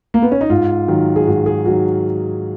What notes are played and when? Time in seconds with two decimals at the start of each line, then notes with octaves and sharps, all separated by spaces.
0.14 A#3
0.22 B3
0.31 C#4
0.41 D#4
0.50 G#2 F4
0.88 D#3 F#3
1.16 G#4
1.27 G#2 F#4
1.46 G#4
1.65 D#3 F#3 F#4